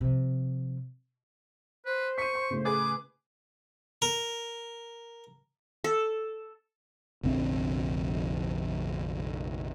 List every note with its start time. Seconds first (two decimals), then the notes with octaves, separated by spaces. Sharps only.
0.01 C3 F3
1.86 B4 C5
2.18 C#6 B6 D#7
2.35 C6
2.50 A2 C#3
2.65 G#4 B4 D6
4.02 A#4
5.84 A4
7.23 F1 A#1 D3 C4